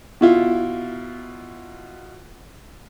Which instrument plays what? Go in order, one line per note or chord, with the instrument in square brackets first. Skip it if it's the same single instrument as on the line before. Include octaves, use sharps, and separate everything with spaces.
[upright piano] B2 E4 F4